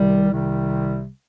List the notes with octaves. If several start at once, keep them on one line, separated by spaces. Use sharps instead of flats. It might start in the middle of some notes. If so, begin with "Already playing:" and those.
Already playing: C2 C3 D#3 G3
C2 C3 D#3 G3